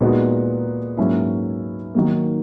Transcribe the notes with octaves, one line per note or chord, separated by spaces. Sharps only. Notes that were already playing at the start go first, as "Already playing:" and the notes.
A#2 G#3 B3 D#4 F#4
G#2 F#3 A#3 C#4 E4
D#3 F#3 A#3